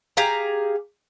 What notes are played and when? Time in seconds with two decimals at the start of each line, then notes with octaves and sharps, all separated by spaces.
0.17 G4 G#4 F5 A#5